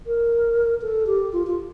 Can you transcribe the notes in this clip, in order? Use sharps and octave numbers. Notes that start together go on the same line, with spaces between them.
A#4
A4
G4
F4
F4